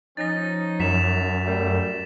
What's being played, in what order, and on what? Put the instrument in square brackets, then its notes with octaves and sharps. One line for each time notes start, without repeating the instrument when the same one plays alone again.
[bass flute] F3 [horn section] C#4 D#4 [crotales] A6 A#6
[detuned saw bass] F#2 [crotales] B6 E7 F7
[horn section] G3 A3 [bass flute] A#4